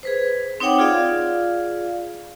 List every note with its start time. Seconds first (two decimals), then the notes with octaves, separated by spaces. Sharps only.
0.03 G#4 B4 C5
0.60 C4 D#4 C#5 F#5 G5 D6
0.79 F4 G#4 D5 F5